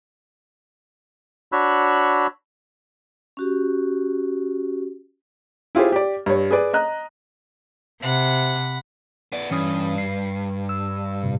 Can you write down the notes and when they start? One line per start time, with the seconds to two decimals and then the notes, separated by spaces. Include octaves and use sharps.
1.52 D4 F#4 C#5 B5 E6 F#6
3.37 C#4 F#4 G4
5.75 E4 F4 G4 G#4 C5
5.92 G4 D5
6.26 G2 C#5
6.51 G#4 B4 D5
6.73 D#5 A#5 F#6
8.02 C3 F#5 B5
9.32 B3 D5
9.51 G2 E3 C#4 D#6
9.98 C7
10.69 E6
11.23 A2 C3